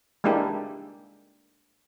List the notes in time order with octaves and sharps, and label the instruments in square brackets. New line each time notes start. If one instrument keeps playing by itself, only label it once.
[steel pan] G#3 A#3 D4 E4 G4